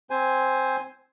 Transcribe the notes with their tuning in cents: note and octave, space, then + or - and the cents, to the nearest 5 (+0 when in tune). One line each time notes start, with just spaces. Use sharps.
C4 +0 C5 +0 G#5 +0